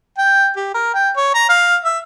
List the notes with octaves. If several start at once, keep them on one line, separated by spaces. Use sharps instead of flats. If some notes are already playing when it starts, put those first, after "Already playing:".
G5
G4
A#4
G5
C#5
A#5
F5
E5